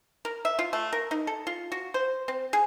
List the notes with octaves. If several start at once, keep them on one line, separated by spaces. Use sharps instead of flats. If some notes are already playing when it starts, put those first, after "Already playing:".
A#4
E5
F4
A3
A#4
D#4
A4
F4
F#4
C5
C4
G#4